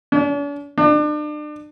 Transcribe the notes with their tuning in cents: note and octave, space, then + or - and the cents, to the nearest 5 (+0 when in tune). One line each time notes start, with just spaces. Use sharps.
D4 -45
D4 +35